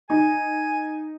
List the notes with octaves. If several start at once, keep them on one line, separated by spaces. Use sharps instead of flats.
D#4 G#5